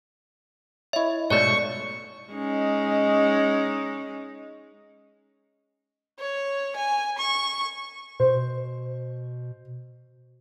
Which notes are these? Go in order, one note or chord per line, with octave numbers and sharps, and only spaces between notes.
E4 C#5 D#5 E5
G#2 B2 A3 C#5 D5 C#6
G#3 C#4 D#4
C#5
G#5
C#6
B2 C5